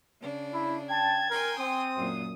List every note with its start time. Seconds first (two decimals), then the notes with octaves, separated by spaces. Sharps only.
0.22 C#3 D4
0.53 E4
0.90 G5 A5 G#6
1.30 A#4 G5 G#5 C6
1.59 C4 D#6
1.96 F#2 A#2